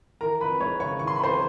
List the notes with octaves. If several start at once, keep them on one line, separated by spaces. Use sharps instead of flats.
E3 A#4 A#5
F2 B4 B5
G#3 C#5 C#6
C#3 C#5 C#6
E3 C#6
C6
B5
F2 C5 C6